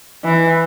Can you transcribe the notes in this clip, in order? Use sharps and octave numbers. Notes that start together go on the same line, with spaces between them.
E3